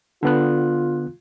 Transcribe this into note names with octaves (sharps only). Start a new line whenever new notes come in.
D3 B3 F4 F#6